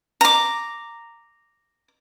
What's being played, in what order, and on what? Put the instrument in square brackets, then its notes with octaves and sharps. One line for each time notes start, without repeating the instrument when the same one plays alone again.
[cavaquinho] A#5 D6